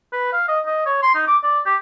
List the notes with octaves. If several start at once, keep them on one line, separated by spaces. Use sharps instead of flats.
B4
F5
D#5
D#5
C#5
C6
D#4
D6
D5
G4